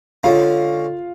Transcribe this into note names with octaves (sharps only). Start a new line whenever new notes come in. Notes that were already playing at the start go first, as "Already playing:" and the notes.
D3 G#3 C#4 F4 F5